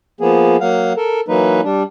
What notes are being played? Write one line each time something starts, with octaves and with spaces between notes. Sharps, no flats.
F3 A#3 B3 G#4
F#3 A#3 F5 F#5
A4 A#4
E3 F#3 A#3 D#4 B4
G3 D4